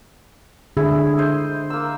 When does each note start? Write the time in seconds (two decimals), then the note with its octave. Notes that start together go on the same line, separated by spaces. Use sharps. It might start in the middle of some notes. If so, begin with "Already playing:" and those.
0.77 D3 E4 G#4
1.18 C5 D#5
1.70 A#3 E6